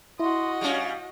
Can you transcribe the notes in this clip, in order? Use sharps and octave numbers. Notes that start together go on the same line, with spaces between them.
E4 F#4 D#5 C6
G3 C#4 F5